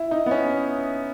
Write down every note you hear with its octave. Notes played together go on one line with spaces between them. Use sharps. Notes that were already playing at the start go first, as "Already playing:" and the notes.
Already playing: E4
D#4
B3
C#4